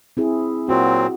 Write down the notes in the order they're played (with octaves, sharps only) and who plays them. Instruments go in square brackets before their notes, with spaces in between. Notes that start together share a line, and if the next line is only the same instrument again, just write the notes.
[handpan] C4 E4 G#4
[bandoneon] A#2 F#3 C4 [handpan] F#4